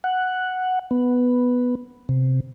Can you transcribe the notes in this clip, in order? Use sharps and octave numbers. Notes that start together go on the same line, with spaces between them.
F#5
B3
C3